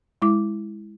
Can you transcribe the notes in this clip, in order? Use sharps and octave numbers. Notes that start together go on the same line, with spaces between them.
G#3 E4 D6